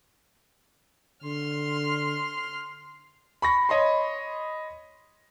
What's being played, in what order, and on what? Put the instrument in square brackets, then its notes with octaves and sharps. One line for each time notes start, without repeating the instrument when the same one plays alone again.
[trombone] D3 [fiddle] C6 F6
[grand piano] B5 C#6 A#6
C#5 D#5 B5 C6